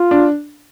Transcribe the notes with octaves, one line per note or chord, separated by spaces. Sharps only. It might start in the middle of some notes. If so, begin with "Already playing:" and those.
Already playing: F4
D4